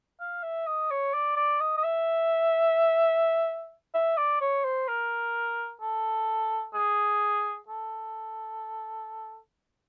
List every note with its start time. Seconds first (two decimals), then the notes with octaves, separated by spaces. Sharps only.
0.20 F5
0.43 E5
0.67 D#5
0.91 C#5
1.14 D5
1.36 D5
1.60 D#5
1.77 D#5
1.84 E5
3.95 E5
4.17 D5
4.41 C#5
4.64 C5
4.88 A#4
5.81 A4
6.74 G#4
7.69 A4